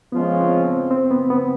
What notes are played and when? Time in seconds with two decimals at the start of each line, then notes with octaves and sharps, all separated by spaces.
0.12 F3 G#3 B3 C#4 F4
0.39 C4
0.64 C4
0.91 C4
1.11 B3
1.30 B3